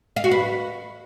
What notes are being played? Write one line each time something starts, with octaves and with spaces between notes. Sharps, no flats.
F5
F#4
B4